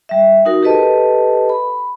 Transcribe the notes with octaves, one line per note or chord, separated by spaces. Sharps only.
G3 E5
D#4 F#4 A#4
G4 A4 B4 D#5 A5
B5